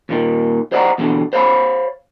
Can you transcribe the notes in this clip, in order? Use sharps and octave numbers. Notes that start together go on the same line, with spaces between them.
D#2 A#2 D#3
C5 D5 D#5 F5 F#5 A#5
E2 B2 D3
C5 C#5 F5 A#5 B5